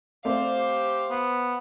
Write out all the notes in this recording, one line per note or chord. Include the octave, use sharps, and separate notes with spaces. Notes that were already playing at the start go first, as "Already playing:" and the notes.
A3 C4 C5 D5 F5
G4
B3